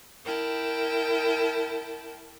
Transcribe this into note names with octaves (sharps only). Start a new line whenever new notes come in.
E4 A#4 G5 A5